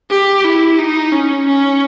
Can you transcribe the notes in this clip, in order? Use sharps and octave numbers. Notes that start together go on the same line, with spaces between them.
G4
E4
D#4
C#4
C#4